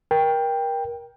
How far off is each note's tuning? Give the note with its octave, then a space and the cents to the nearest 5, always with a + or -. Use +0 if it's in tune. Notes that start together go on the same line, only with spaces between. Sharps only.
A#4 +25 G5 +10